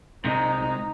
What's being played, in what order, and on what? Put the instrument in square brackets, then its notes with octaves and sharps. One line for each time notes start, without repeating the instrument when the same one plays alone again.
[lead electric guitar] C3 G#3 [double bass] D#4